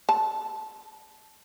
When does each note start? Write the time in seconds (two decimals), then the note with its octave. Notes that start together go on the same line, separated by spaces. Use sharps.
0.09 A5